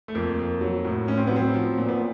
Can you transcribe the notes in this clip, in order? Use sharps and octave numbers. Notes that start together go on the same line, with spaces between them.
A3
F2 A#3
F2
F#3
A2
A2 C#4
C4
F#3 B3
C4
F3
A#2
B3